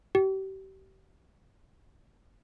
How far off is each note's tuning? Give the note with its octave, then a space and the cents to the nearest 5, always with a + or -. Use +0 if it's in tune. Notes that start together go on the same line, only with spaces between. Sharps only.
G4 -35